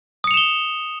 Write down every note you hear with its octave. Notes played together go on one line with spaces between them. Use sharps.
D#6 C#7 E7 F7 G7